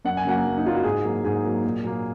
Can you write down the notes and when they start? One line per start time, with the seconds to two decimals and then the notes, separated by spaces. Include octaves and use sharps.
0.05 F#2 F#5
0.17 G#5
0.25 C#3 F#3 A#3 F#5
0.44 F#2
0.58 D#4
0.65 C#3 F#3 A#3 F4
0.75 F#4
0.84 G#2 G#4
1.04 F#3 A#3
1.24 G#2 G#4
1.44 F#3 A#3
1.64 A#2
1.84 F#3 A#3